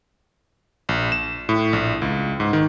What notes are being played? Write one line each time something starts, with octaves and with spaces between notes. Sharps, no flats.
A#1
E7
A2
A#1
C#2
G#2
D#3